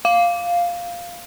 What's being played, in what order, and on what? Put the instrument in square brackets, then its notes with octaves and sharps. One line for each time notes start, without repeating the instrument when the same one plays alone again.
[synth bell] F5